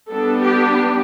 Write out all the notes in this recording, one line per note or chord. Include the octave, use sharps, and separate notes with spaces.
G3 B3 D4 A4
G4